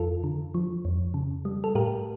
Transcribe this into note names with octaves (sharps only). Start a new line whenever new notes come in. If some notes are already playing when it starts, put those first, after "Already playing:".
Already playing: F2 F4 A4
D3
F3
F2
C#3
G3
A4
A2 G4 A#4